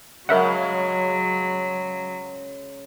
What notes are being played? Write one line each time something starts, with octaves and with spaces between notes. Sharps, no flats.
C#3 F#3 G#3 A#4 E5 F#5